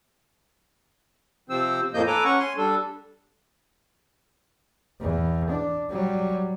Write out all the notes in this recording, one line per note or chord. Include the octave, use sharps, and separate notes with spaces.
C3 F3 C4 C5 E6
F2 A2 F3 A#3 D#5 G6
A4 B4 G#5 A#5 D6
C#4 F#5 C#6
G#5 C6
G3 D4 A4
E2
D4
F#3 G3